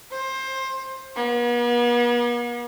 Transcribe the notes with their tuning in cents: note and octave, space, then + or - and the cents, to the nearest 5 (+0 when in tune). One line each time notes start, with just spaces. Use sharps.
C5 +20
B3 -45